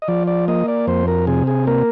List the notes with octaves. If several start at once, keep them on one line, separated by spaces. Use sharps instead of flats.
D#5
F3 D5
D5
A#3 D#5
D5
F2 C5
A#4
C3 G#4
G#4
A#3 A#4